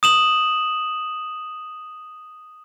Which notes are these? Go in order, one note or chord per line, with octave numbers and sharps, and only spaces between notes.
D#6 E7 F#7